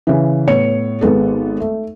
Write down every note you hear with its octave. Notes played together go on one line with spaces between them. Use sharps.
C#3 E3
A2 B3 C#5 C#7
G#1 G#3 B3 A4
A3